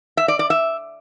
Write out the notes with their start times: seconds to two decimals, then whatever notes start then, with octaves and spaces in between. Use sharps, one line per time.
0.17 E5
0.28 D5
0.39 D5
0.50 E5